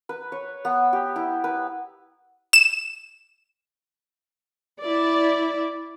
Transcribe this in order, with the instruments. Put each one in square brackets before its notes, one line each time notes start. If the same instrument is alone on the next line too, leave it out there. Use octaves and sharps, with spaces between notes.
[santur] B4
C#5
B3
G4
E4
B4
[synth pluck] E7
[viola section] E4 D5